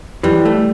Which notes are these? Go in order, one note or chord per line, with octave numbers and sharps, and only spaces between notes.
E3 G3
A3